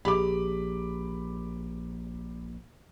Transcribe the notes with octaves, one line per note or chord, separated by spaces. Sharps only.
A#1 G4 G#4 B5 D6